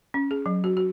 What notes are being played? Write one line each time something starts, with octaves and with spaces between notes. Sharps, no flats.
C#4
G#4
F#3
F#4
F#4